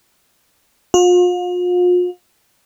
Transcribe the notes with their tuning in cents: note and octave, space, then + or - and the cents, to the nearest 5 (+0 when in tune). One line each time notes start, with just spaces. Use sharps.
F4 +40